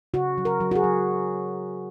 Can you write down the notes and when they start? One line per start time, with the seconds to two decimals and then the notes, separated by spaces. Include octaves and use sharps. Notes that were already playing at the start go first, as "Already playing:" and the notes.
0.14 C#3 F#4
0.38 F#3
0.45 A#4
0.60 F#3
0.71 F#4
0.75 G#4
0.84 F#3